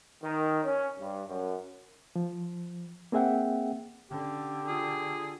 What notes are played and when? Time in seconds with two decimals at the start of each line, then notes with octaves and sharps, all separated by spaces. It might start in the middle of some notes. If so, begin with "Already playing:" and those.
0.23 D#3
0.64 C#4
0.99 G2
1.28 F#2
2.16 F3
3.12 A#3 C4 G#4 E5 F#5 G5
4.11 D3 C#4 G4
4.67 F4 G#4